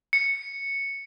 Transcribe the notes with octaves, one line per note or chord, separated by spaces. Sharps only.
C#7